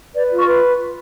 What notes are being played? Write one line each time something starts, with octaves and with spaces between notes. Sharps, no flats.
B4 D5
F4 C#6
B4